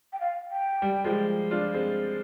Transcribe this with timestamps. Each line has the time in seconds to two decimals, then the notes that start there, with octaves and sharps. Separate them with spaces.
0.13 G5
0.20 F5
0.51 G5
0.82 G3
1.04 F3 G#3
1.51 D4 F4
1.74 G#3 C4